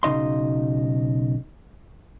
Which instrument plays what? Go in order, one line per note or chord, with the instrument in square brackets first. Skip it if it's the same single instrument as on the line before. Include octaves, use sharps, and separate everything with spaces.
[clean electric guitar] B1 C#3 D#4 D#5 C6